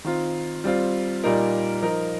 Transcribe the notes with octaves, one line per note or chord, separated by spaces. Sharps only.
D#3 C4 F4
G3 C4 F4
A#2 G3 D#4 A#4
F3 D#4 A#4